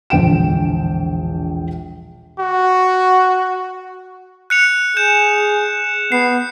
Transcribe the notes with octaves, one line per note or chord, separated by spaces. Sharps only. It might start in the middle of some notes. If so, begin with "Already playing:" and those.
E1 A#1 D3 G5 D7 E7
F#4
F#6 C#7 F7
G#4 G6 E7
B3 C7